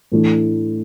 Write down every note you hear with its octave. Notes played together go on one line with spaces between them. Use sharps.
A2 E3 A3 D4